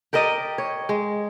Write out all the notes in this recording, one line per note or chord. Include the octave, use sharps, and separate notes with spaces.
G4 A#4 D5 D#5
C#5
G#3